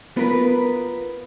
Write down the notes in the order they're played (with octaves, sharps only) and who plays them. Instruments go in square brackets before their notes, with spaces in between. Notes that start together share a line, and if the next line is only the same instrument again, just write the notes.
[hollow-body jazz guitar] B3 F4 A#4 B4